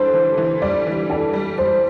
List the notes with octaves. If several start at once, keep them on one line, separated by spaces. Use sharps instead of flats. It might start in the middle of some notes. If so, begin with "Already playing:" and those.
Already playing: E3 G3 D4 A4 C5
E3
E3
G3 D5
E3
E3 A4
G3
G3 C5